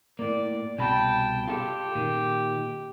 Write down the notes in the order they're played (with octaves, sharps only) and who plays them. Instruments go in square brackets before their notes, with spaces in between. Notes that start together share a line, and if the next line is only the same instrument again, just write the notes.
[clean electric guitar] A2 A#3 [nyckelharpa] D5
[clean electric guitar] C2 B2 B5 [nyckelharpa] G5 A5
[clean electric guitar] F4 A4 [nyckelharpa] G4
[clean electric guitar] A#2 D#3